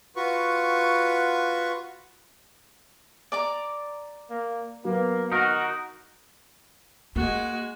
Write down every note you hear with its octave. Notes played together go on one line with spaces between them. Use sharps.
F4 F#4 B4 C#6
D5 A#5 D6
A#3
F#3 A#3 B3
D#4 F#4 A#4
G#3 A#3 F#4